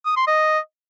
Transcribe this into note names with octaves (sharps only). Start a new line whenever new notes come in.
D#6
C6
D#5